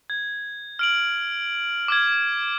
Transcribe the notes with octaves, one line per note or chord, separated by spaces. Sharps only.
G#6
F6 D7 F#7
D6 F6 G#6